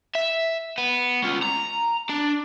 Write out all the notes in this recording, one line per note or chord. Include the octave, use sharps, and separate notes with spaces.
E5
B3
C#4 F4
A#5
D4